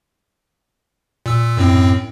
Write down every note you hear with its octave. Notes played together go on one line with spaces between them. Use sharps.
A#2 E6
F#2 A2 C4